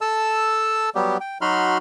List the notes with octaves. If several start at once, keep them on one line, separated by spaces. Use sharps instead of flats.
A4 A5 E6
F#3 G3 B3 G4
G5
F#3 D#4 F#4 B5 C6 F6